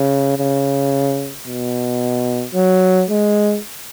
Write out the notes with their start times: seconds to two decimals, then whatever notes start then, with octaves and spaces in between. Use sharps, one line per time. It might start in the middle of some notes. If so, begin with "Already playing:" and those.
Already playing: C#3
0.38 C#3
1.47 B2
2.55 F#3
3.10 G#3